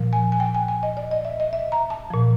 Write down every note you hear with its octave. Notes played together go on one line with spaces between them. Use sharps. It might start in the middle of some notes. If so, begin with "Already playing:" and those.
Already playing: A#2 F3
G#5
G#5
G5
G#5
G#5
D#5
D5
D#5
E5
D#5
E5
A#5
A5
A#2 F3